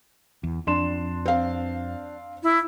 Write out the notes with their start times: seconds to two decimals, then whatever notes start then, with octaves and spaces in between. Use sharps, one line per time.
0.44 E2
0.67 F2 D4 C6 E7
1.26 C4 F5
2.43 E4